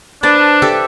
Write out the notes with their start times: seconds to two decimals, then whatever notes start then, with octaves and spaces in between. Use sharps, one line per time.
0.23 D4 B4 C5 A5
0.62 G4 A4 E5